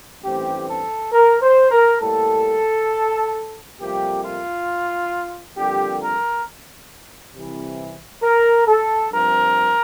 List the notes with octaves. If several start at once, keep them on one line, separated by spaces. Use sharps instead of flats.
A1 G2 E3 A3 C4 G4
A4
A#4
C5
A#4
A2 G3 A#3 A4
F2 C3 G3 A#3 G4
F4
F2 D3 G3 A#3 G4
A#4
C2 C3 E3
A#4
A4
G2 F3 C4 A#4